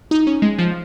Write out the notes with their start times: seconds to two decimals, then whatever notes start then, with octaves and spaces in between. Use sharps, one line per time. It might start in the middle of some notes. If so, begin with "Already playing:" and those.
0.11 D#4
0.27 C#4
0.42 G#3
0.59 F3